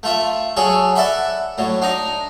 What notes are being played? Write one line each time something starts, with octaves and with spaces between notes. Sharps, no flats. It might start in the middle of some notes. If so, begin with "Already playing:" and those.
A3 F4 E5
F#3 G#4 A4 C#5
A4 D5 E5 F#5 B5
A2 F#3
D4 D#4 A#5